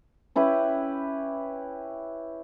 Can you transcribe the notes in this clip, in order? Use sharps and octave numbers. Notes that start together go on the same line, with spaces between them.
C#4 E4 G4 B4